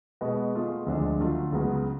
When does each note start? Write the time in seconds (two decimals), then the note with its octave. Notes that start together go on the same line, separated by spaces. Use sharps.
0.21 B2 G#3 B3
0.54 B2 A3 F4 G#4
0.86 D2 D3 F3 G#3 D4
1.19 D3 F#3 A3 F4 A4
1.52 C#2 C#3 F#3 B3